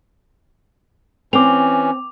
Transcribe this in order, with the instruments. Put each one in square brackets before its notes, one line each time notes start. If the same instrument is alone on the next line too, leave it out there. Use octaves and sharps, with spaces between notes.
[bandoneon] E3 C#4 [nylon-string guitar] C4 [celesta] D6 F7